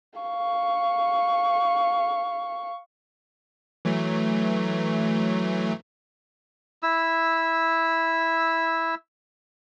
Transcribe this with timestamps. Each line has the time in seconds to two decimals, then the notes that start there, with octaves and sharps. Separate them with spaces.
0.20 F5 C#6
3.85 E3 F#3 A3
6.83 E4 E6